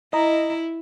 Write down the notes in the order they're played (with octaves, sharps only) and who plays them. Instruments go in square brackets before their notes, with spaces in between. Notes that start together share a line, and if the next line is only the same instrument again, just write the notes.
[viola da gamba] E4 [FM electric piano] D#5 A#5